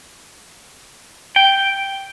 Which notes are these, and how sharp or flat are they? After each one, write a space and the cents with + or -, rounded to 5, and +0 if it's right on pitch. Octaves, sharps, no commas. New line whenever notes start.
G5 +0